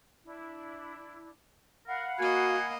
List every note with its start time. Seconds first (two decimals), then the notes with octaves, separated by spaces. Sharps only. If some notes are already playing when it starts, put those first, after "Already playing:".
0.25 D4 E4
1.87 A#4 F5 F#5 B5
2.19 A#3 F#4 D#5 G#5